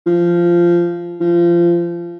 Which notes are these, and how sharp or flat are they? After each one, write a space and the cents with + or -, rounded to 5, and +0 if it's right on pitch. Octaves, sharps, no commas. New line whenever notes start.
F3 -15
F3 -25